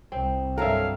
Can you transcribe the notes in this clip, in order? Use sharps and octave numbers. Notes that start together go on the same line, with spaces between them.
C2 C4
G2 F#3 G3 A4 A#4 E5 F5